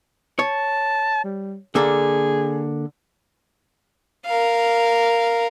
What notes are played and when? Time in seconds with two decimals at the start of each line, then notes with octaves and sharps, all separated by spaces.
0.39 C#5 A5
1.24 G3
1.75 D3 A#3 G#4 A4
4.26 A#4 F5